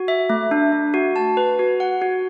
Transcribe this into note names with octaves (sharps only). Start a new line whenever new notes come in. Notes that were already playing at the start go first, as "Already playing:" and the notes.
Already playing: F#4
E5
A3
D4
A3
F#4
A5
B4
F#4
F#5
F#4